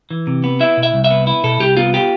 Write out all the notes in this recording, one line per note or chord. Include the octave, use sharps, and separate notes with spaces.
E3
C3
B3
E4 E5
B2
E5
C2
E5
B3
E4
B2 A4
C2 G4
B3 F4
F4 G4